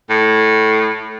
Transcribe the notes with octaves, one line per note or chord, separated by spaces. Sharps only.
A2